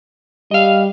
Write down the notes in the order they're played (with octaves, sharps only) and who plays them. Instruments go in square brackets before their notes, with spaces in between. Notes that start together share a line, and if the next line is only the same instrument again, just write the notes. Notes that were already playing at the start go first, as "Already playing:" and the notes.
[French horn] G3 [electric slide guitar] D#5 F5